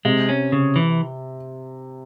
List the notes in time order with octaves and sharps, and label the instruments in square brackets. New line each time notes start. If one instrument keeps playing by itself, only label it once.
[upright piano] C3 [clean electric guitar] G#3
[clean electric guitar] C#4
C#3
E3